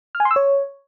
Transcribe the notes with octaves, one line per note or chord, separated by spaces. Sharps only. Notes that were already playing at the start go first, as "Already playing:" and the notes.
F6
G#5
C6
E6
C#5